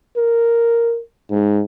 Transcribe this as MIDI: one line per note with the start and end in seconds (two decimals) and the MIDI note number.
0.16 1.00 70
1.31 1.62 44